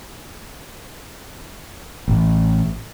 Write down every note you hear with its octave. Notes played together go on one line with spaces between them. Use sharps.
A1